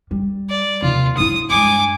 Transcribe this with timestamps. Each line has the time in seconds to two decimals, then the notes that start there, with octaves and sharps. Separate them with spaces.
0.11 G3
0.49 D5
0.82 D#2 C3 F4
1.17 F#3 E4 D#6
1.50 G2 G#3 G#5 D6